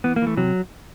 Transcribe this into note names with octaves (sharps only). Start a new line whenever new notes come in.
E3 B3
A#3
E3 A3
C3 F#3